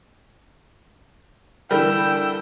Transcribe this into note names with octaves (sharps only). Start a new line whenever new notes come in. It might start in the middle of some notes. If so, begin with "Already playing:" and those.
D3 E3 G3 A#4 G5 E6